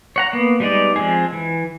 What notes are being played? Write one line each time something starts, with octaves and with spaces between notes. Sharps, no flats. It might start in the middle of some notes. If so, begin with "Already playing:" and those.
C#5 F#5 A#5
A#3 B3
G3 G#3 B3 D#4 D5
F3 G#3 C4 G#4
E3